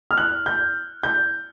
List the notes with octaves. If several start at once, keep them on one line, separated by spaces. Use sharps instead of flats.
F6
F#6
G6
G6